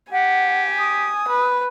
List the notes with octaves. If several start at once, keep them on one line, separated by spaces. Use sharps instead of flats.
G4 F#5 G#5
D#6
B4